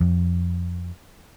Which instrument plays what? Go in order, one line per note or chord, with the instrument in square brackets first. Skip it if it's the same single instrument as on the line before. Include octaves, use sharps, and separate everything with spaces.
[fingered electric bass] F2